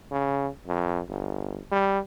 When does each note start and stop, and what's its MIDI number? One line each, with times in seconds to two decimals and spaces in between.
0.12 0.48 49
0.67 1.00 41
1.09 1.59 31
1.72 1.99 55